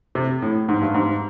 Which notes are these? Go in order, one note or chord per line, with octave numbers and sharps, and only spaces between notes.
C3
A2
G#2
G2
G#2